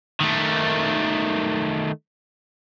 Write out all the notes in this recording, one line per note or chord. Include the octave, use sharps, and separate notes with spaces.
D#3 A3